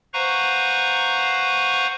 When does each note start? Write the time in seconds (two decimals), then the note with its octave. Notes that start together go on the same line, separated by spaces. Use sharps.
0.13 B4 C5 F5 F#5 A#5 C#6